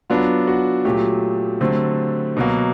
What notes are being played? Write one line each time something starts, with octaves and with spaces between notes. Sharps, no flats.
F#3 B3 D4 F4
F#4
A#2 F#3 A3 G4
D3 F#3 A3 C4
B2 F#3 A#3